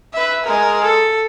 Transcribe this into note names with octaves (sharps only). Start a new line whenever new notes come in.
B4 E5
G#3 A#4
A4